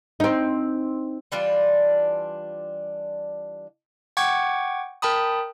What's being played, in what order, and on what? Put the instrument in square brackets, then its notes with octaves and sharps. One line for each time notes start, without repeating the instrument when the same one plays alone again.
[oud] C4 D#4
[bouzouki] E3 G3 D4 F4
[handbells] F#5 G5 C#6 D6 G#6
A#4 G5 A5 B5 D#6